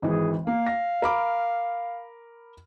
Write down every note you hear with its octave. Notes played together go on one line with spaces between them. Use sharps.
G#1 E3 G#4
A#3 F5
A#6
A#4 B5 D6